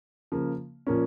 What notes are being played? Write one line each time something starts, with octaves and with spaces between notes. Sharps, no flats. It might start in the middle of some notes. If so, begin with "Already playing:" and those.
C#3 F3 A#3
A#2 F3 A#3 C#4